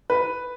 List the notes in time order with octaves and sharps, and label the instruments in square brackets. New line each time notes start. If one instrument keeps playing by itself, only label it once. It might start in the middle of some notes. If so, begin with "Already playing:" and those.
[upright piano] B4